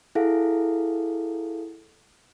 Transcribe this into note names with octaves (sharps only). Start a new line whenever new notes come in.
E4 G#4 A4 F5 F#5